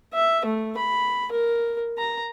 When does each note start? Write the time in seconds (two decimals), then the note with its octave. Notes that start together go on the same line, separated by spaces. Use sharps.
0.14 E5
0.45 A3
0.77 B5
1.32 A#4
1.98 A#5